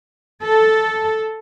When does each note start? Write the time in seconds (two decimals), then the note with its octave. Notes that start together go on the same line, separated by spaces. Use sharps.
0.43 A4